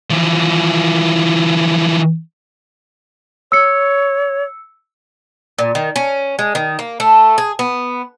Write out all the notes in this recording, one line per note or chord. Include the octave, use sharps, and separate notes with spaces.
E3 F3
C#5 E6 C#7
A#2
D#3
C#4
G#3
D#3
A#3
A3
G#4
B3